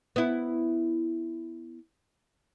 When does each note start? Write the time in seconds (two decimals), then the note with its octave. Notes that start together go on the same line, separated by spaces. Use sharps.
0.16 B3 E4